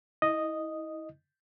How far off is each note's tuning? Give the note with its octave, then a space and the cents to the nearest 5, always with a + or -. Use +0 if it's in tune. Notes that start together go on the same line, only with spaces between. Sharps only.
E4 -30 D#5 +0